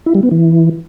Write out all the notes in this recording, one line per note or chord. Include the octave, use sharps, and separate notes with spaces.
E4
G3
B3
E3